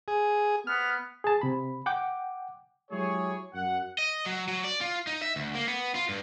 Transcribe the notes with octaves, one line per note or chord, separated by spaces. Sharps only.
G#4
B3 F6
G#4 A5
C3 B5
F#5 G5 D6
F#3 G#3 E4 G4 G#4 C#5
F#2 F#5
D#5
F#3
F#3
D5
F4
D#4
E5
D2
A#3
B3
F4
G2